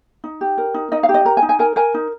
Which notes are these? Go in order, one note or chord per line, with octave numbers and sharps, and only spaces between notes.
D#4
G4
A#4
D#4
D#4 D#5
F5
G4
D#5
A#4 A#5
G#5
D#4
G#5
A#4 G#5
A#4 G#5
D#4